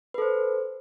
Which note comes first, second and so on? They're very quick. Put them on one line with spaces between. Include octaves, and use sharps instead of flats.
B4 A4 C5